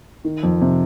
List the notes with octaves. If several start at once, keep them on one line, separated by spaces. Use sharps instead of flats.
D#3
F2
C3